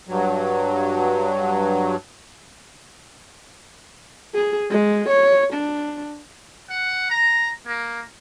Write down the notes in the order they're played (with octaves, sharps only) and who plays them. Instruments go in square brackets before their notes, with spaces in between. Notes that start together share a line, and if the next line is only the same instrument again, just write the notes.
[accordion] G2 F#3
[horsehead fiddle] G#4
G#3
C#5
D4
[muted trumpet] F#5
A#5
A#3